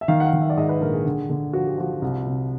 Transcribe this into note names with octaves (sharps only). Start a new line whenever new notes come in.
E5
D#3 F5
F#5
F5
D#3
E5
D5
G#2 D#5
B4
A#1 A#4
G#4
D3
D3
F3 F#4
G4
F3 F#4
C2
C3